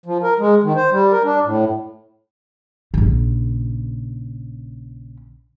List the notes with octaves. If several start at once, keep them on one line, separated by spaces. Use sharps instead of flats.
F3
A#4
G#3
D#3
C5
G3
A#4
D4
A2
A#1 C#3